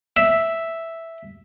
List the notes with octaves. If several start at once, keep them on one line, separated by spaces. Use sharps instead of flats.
E5